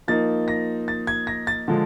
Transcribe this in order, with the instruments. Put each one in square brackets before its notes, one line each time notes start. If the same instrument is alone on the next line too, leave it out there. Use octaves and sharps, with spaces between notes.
[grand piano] F3 A#3 D#4 A6
A#6
A6
G#6
A#6
A6
D3 F3 G#3